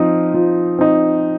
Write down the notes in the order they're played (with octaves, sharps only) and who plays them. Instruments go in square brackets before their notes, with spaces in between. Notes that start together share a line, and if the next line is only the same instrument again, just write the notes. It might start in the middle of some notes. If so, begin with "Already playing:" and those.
Already playing: [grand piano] F3 C4 D#4
F3
C4 D#4